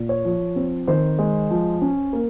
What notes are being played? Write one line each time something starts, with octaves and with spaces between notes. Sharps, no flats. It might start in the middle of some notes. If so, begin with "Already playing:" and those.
Already playing: A#2
C#5
F3
C4
D#3 C5
G#3
F3
C#4
A#3